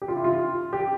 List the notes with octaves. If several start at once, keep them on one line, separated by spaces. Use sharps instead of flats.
G4
F4
E4
F4
G4